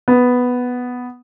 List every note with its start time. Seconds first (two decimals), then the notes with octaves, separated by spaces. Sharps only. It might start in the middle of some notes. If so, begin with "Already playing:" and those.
0.08 B3